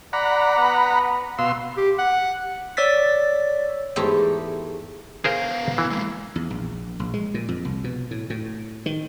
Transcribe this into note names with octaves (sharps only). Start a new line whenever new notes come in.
D5 F#5 A#5 B5
B3
B2 F5 C6 E6
G4
F#5
C#5 D5 E6 A6 B6
E2 G#2 A3 G4 A#5
B3 G#4 A#4 C5 F5
E3
G#3 A#3
E2
A#1
A#1
G#3
A#2
F2
C2
B2
A2
A2
D#3